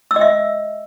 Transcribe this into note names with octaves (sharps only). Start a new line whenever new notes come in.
E6
D#5
E5